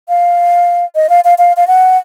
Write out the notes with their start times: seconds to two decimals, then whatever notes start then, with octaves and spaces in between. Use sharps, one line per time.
0.09 F5
0.95 D#5
1.09 F5
1.24 F5
1.38 F5
1.57 F5
1.67 F#5